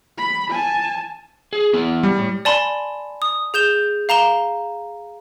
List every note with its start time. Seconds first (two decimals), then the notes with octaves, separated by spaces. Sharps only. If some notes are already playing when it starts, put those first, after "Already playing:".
0.18 B5
0.51 G#5 A5
1.53 G#4
1.73 B3 E4
2.03 G3
2.18 A2
2.45 D5 G#5 A5 B5 C6
3.22 D#6
3.54 G#4 G6 E7 G7
4.09 F5 A#5 E7 G7